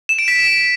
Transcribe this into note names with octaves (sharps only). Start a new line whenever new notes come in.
E7
D7
B6